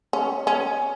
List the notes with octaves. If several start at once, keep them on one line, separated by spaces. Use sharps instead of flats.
C#4
C#4